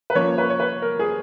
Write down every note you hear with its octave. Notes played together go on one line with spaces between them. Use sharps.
B4
F3 A#3 C#4 C#5
B4
C#5
B4
A#4
G#4